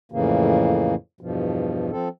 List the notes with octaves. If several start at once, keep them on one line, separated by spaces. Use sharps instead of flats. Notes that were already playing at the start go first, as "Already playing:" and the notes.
F2 A2 C#3 E3 A#3
E2 G2 B2 F3
F3 C4 A4